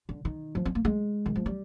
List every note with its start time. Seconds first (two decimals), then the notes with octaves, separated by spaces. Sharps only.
0.09 D3
0.25 D#3
0.55 F3
0.65 C4
0.75 A#3
0.85 G#3
1.26 D#3
1.36 F3
1.46 G3